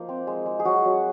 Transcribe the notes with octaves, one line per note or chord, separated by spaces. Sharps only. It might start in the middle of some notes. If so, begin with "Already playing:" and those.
Already playing: F3 A#3 D#4
C4
G#3
G#3
G#4
F#3 F#4
F#3